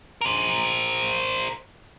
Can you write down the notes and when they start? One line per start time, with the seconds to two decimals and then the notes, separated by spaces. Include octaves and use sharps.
0.21 A#4 C5